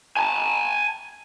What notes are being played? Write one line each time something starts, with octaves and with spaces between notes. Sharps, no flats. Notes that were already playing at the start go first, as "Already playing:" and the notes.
G#5 A5